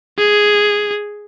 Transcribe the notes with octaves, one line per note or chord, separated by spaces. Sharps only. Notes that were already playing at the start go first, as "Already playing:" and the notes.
G#4